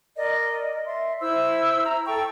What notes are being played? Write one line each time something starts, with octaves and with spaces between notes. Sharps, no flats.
A#4 D5 D#5
E5 C6
E4 C5 E6
A#5
A4 G5 C#6 E6